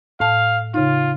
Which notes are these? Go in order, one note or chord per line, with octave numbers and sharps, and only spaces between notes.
A2 F5 A5
C#3 D#4 F4